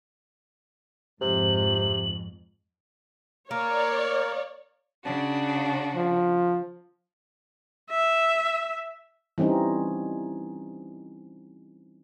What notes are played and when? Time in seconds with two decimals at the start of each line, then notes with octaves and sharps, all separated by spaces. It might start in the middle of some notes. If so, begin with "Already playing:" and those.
1.22 F2 G#2 C3 F#7
3.51 A#3 A#4 C#5 D5
5.04 C#3 D4 F#4
5.96 F3
7.90 E5
9.38 E3 G3 C4 C#4 D#4